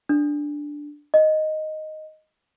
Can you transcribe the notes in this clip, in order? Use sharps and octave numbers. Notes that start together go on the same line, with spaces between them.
D4
D#5